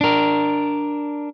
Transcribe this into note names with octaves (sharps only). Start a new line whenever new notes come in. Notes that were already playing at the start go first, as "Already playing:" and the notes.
D4 A#4